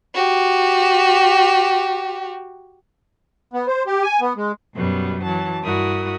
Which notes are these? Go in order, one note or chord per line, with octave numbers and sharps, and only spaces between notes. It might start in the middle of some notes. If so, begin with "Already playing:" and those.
F#4 G4
B3
C5
G4
G#5
B3
G#3
F#2 B2 G3 B3
E3 F#3 A5
G2 E4 F#4 A#4 D#6